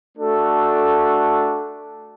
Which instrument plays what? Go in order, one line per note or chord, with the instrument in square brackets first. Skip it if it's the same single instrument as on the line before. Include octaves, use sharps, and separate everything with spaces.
[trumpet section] A3 D4 F#4 A4